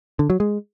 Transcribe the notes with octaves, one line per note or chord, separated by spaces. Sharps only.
D3
F#3
G#3